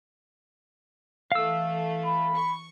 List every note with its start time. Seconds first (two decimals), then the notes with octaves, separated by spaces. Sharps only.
1.32 E3 A3 F5 E6
2.06 B5
2.35 C#6